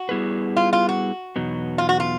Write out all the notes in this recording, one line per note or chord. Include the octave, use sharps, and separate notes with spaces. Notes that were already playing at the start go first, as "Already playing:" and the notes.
Already playing: F#4
G3 B3 E4 G#4 B4
F4
F4
F#4
E2 B2 F#3 B3 D#4
F4
F#4
F4